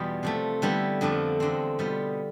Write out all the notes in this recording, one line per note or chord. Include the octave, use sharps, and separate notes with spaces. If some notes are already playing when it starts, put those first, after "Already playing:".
Already playing: E2 B2 G3 B3 F4
C3 F3 A3
D3 G3 B3 E4
F2 D3 F3 A3 D4
E2 D3 F3 C4
B2 G3 B3 F4